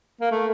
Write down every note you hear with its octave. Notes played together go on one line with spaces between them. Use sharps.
A#3
A3